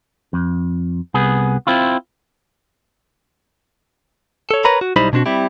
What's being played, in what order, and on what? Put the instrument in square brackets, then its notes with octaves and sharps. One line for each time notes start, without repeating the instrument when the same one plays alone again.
[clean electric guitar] F2
C2 B3 G#4
C4 E4 F4
A4 C#5
A#4 B4 C#5 A#5 B5
F#4
B1 G3 D#4 E4 C5 B5
B2 C4 D4 F#4
G3 C4 E4 G4